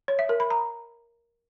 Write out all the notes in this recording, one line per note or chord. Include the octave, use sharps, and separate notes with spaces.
C#5
E5
A#4
B5
A#5